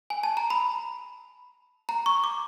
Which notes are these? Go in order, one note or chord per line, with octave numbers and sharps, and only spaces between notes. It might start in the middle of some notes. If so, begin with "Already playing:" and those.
G#5
A5
A#5
B5
A#5
C#6
D6